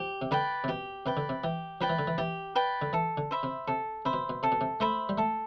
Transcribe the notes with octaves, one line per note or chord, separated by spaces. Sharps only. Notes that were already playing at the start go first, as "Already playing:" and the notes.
Already playing: F3 G4
C3
D3 B4 D5 G5
C3
B2 G4
C3 B4 D5 G5
D3
C3
E3 G4
F3 B4 D5 G5
E3
D3
E3
E3 G4
B4 D5 G5
D3
E3 A4
D3
C5 E5 B5
C3
C3 A4
C3 C5 E5 B5
B2
B2
C3 A4
B2
C3
A3 C5 E5 B5
G3
A3 A4